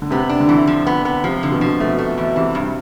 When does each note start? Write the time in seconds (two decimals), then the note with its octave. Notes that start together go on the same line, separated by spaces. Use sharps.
0.02 D3
0.11 C3 B3
0.29 D4
0.40 D3
0.49 E3
0.67 F3
0.87 B3
1.05 B3
1.24 C3 F3
1.43 D3
1.52 B2
1.61 F3
1.80 B2 A3
1.99 A3
2.18 E2
2.36 C3 E3
2.55 G2